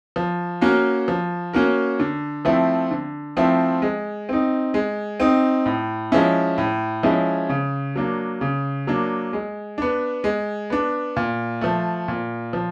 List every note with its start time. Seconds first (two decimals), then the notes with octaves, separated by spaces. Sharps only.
0.16 F3
0.61 A#3 C#4 F#4 A#4
1.08 F3
1.53 A#3 C#4 F#4 A#4
2.00 D3
2.45 F3 A3 C4 E4
2.91 D3
3.37 F3 A3 C4 E4
3.82 G#3
4.29 C4 D#4
4.74 G#3
5.20 C4 D#4
5.66 A2
6.12 F3 G#3 C#4 E4
6.58 A2
7.03 F3 G#3 C#4 E4
7.49 C#3
7.96 F#3 A#3 D4
8.41 C#3
8.87 F#3 A#3 D4
9.33 G#3
9.78 B3 D4
10.24 G#3
10.70 B3 D4
11.16 A#2
11.61 F3 A3
12.08 A#2
12.53 F3